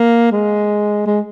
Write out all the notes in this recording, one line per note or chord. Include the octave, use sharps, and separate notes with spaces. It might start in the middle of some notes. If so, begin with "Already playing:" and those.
Already playing: A#3
G#3
G#3